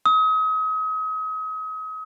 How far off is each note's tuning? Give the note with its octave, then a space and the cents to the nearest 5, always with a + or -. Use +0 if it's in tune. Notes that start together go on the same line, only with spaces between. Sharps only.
D#6 +35